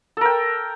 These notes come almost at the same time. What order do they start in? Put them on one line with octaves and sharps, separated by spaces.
A4 A#4 G5